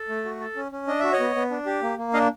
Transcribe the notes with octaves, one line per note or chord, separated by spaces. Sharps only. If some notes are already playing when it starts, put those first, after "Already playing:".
Already playing: A4
A3
F#4
A4
C#4
C#4
D4 D#5
F#4 E5
C#5 D#5
B3
B3
D4
G4
A#3
A#3
D4 D#5 F5